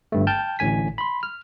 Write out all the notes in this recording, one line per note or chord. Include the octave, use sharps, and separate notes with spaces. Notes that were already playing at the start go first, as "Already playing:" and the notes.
G1 G2 A3
G5 A5 F6 G6
A1 A2 D3 G#5 B6
B5 C6
F6